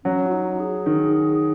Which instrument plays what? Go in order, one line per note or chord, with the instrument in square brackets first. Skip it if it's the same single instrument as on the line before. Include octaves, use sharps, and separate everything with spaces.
[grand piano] F#3 [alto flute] C#4
[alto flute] F#4
D#4
G#4
[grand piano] D#3